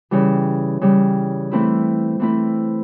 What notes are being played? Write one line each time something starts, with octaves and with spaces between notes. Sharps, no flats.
C#3 E3 G3
C#3 E3 G3
E3 A3 C4 E4
E3 A3 C4 E4